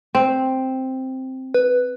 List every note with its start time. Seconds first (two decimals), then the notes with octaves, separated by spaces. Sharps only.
0.15 C4
1.54 B4